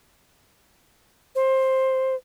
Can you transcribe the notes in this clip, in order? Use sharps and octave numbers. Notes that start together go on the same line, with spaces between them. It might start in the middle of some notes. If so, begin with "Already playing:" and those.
C5